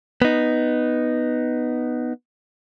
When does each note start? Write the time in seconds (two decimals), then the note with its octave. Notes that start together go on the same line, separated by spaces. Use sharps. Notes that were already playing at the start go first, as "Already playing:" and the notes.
0.22 B3 D#4